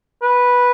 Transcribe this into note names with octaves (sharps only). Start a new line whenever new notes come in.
B4